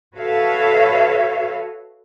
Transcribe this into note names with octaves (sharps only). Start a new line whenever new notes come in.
F#4 A4 B4 C#5 E5 F5